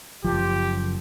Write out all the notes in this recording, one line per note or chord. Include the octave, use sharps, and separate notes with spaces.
F#1 C#2 F3 G4